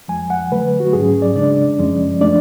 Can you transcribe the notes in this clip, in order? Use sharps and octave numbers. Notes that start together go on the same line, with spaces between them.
F2 F3 G#3 G#5
F#5
D3 F#3 A3 B4
F#4
G#2 F#3 C#4 G#4
D5
C#3 G#3 D4 D5
F#2 F3 G#3 C#4
F3 A3 D4 D5